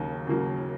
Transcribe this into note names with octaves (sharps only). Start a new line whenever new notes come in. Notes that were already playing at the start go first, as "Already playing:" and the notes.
Already playing: D#2 C#3 F#3 A#3
C#3 F#3 A#3